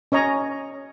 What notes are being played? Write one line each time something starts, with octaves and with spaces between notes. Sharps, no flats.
C#4 C#5 D#5 A#5